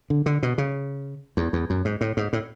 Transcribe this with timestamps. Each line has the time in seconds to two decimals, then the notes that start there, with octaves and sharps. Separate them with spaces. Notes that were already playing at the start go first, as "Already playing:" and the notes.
0.10 D3
0.26 D3
0.43 B2
0.58 C#3
1.37 E2
1.53 E2
1.70 F#2
1.85 G#2
2.01 A2
2.17 G#2
2.33 A2